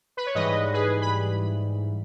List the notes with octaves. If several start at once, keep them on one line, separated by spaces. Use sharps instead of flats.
B4
C#5
G#2 E3 G3 B4 D#5
G#4 B4
B5